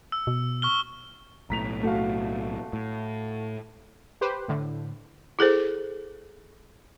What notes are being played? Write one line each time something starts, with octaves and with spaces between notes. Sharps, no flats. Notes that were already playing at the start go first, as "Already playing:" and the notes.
E6
B2
C#6 F6 G7
B1 A2 A#5 B6 F7
A3 F#4 F5
A2
G4 B4 C5
A2 D3
E4 G#4 A4 C5